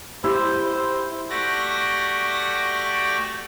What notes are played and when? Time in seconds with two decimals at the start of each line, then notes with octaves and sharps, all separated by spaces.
0.24 E4 G4 C5
0.65 C5
1.30 A3 F#4 G4 D5 A#6